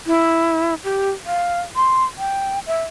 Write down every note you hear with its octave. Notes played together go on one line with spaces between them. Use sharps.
E4
G4
F5
C6
G5
E5